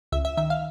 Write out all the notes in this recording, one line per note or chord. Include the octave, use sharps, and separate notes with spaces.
C#2 E5
E5
D#3 E5
F5